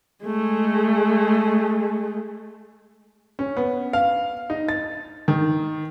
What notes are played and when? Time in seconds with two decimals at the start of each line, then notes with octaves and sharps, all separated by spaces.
0.24 G#3 A3
3.39 C#4
3.57 B3
3.93 F5
4.50 D#4
4.69 A6
5.28 D#3